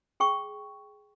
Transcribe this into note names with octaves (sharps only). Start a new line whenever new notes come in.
G#4 G5 C#6